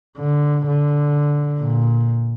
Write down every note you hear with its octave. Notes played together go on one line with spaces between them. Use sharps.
D3
D3
A#2